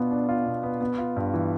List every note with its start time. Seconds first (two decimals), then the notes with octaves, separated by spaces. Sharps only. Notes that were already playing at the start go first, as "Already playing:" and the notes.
Already playing: B2 B3 D4 F4
0.11 D4
0.29 F4
0.45 B2
0.63 B3
0.81 B3
0.98 F4
1.17 G2
1.34 E3